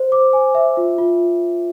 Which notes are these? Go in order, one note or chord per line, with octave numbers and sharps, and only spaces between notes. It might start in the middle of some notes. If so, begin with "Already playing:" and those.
Already playing: C5
D6
G#5
E5
F4
F4